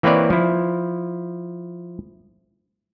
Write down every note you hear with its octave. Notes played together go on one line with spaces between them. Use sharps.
E3 A#3 C4 B4 C#5 D5
F3 E4